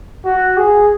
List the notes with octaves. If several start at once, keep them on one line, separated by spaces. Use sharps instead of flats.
F#4
G#4